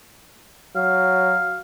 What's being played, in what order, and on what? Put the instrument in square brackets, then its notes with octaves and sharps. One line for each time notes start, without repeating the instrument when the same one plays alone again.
[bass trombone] F#3 [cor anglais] F5